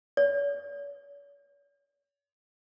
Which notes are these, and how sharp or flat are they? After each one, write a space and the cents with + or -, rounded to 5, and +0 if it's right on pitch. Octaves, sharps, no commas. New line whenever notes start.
C#5 +40